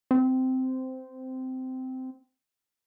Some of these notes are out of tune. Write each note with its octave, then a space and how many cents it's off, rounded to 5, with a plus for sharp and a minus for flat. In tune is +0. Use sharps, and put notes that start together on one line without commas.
C4 -15